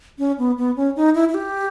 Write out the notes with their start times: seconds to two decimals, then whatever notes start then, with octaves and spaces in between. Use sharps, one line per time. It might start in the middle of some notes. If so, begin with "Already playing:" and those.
0.19 C#4
0.38 B3
0.57 B3
0.76 C#4
0.96 D#4
1.15 E4
1.29 E4
1.34 G4